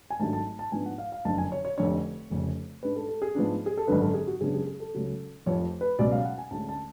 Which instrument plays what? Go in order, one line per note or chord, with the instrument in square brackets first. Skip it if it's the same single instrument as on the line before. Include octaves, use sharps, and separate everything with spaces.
[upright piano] G#5
G#1 G#2 F#3 A3 D4 A5
A5
A5
G#2 F3 B3 D4 G#5
F#5
F5
F5
F#1 F2 D3 A5
G#5
C#5
C#5
F1 F2 D3 C#5
F1 F2 C#3
G#2 G#3 D4 B4
A4
A4
G#4
G#2 F3 B3 D4
G#4
A4
G#1 F#2 D3 B4
A4
G#4
F#4
F#2 C#3 G#3 B3 D4 G#4
G#4
G#4
A4
C#2 C#3 F#3 C#4
F1 F2 F3 C#5
B4
C#2 B2 F#3 C#4 D5
F5
F#5
G#5
D2 D3 G#3 C#4 A5
A5